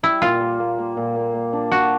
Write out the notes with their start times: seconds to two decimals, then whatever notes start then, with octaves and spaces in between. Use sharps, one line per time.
0.03 G3 E4
0.22 A#2 F4
0.40 A#3
0.60 A#3
0.79 A#3
0.97 A#2
1.16 A#3
1.34 A#3
1.53 D4
1.72 D4 F#4